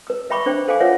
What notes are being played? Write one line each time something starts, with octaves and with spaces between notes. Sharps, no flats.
B4 E6
B4 E5 G5 B5 C#6 D6
D4 C5 G5
A4 C5 F5 G5 G#5 D6
F4 B4 C#5 E5 F#5